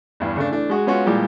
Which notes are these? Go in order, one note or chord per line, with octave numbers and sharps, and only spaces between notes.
E2 G2 E3
C#3 A3 D4
E3 A3 D4
G#3 F#4 G#4
G#3 B3 C#4 F4 F#4
A#2 E3 F3 G3 G#3 D6